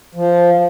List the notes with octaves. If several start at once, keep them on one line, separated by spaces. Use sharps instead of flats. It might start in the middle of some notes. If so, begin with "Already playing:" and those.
F3